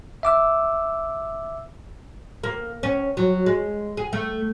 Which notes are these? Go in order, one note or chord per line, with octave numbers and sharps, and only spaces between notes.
E5 D6 E6
A#3
C#4
F#3
G#3
G#4
A3